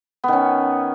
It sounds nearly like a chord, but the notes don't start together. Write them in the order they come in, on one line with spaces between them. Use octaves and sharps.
B3 D#3 C#4